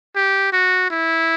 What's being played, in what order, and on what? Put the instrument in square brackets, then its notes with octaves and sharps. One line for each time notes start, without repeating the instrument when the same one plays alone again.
[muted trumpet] G4
F#4
E4